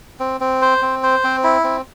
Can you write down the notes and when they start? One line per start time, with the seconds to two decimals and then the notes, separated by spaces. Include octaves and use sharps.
0.20 C4
0.41 C4
0.62 C5
0.82 C4
1.03 C5
1.24 C4
1.44 E4
1.64 C4